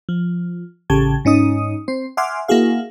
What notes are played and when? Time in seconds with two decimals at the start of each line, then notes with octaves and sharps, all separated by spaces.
0.09 F3
0.90 A1 C#3 G4 A5 G#6
1.25 G#2 C#4 D#4 D#6
1.88 C4 C5
2.17 E5 F#5 G#5 C6 D6 F6
2.48 A#3 E4 F#4 G#4 F5